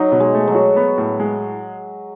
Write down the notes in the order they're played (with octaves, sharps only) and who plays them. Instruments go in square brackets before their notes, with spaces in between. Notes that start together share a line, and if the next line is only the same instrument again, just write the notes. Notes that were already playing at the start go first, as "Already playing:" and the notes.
Already playing: [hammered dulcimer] F#3 [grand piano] D#4
[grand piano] B2
[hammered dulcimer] G#3
[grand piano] A3
[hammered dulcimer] F#3
[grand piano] F#4
B3
A2
G#3